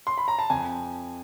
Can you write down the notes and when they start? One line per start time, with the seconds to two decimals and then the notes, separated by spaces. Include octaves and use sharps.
0.07 C6
0.18 B5
0.28 A#5
0.39 A5
0.50 F2 G#5